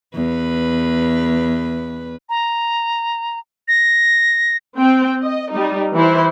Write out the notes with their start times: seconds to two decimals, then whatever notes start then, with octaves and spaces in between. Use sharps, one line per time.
0.15 E2 B4
2.29 A#5
3.68 A#6
4.78 C4 G5
5.21 D#5
5.52 G3 D#4
5.94 E3 E4 C5